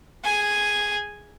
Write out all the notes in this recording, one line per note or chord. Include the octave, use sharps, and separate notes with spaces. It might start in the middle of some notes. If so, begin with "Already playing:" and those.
G#4 G#5